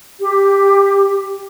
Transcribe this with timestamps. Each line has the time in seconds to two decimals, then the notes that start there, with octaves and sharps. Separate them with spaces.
0.19 G4